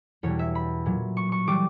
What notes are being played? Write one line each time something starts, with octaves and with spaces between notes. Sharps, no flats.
E2 B2 G3 C#5
E5
B5
A#2 F#3
C#6
C#6
E3 G3 D6